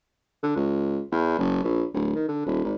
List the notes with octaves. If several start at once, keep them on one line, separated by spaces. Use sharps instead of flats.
D3
C#2
E2
F#1
A#1
D1
D#3
D3
D#1
G#1